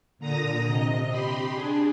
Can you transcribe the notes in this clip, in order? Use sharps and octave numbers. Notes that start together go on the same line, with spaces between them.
A#2 D3 A#5 D#6 A#6
C3 D#5
G4 B5 C6
D4 G#4